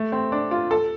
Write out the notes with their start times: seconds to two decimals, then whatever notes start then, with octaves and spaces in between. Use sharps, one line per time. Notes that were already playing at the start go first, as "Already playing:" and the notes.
Already playing: A3
0.12 C4
0.32 D4
0.51 F4
0.71 A4